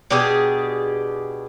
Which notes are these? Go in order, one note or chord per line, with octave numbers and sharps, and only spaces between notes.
B2 D4 G4 G#4